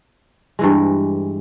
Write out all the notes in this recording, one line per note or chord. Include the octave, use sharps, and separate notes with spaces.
G2 E3 G#3